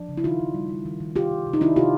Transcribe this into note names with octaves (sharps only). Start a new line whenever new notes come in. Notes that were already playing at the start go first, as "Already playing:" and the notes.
Already playing: F3 D4
C#3
E4
D#3 D#4 F4
D#3
G3
G3
D#3
D#3
C3 F4 G4
D#3
C3
D#4
D#3 D4 E4
C3 F4 G4